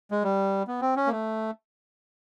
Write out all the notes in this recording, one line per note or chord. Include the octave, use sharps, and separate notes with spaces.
G#3
G3
B3
C4
C#4
A#3
A3